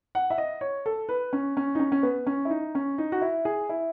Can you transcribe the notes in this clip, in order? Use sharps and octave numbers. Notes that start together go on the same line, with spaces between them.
F#5
E5
D#5
C#5
A4
B4
C#4
C#4
D#4
C#4
C#4
B3
C#4
E4
D#4
C#4
D#4
F#4
E4
G#4
E4